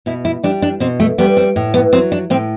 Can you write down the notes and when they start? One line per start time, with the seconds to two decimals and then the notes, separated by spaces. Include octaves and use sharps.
0.06 B2 E4
0.25 E4
0.43 G3 D4
0.62 D4
0.80 B2 C4
1.00 A3
1.18 G3 B3
1.37 C4
1.56 A2
1.74 B3
1.93 F#3 C4
2.12 D4
2.30 A2 C4